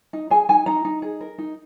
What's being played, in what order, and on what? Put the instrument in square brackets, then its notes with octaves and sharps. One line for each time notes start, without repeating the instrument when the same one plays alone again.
[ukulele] D#4
G#4 G#5
D#4 G#5
D#4 A#5
D#4
G#4
A#4
D#4